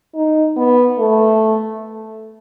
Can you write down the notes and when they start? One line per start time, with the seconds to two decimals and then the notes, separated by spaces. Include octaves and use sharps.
0.15 D#4
0.57 B3
0.99 A3